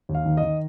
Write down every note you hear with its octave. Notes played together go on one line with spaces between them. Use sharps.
D#2
F5
D#3
D#5
D#3